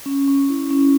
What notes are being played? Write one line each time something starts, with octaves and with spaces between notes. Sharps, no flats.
C#4
C#4
E4
C#4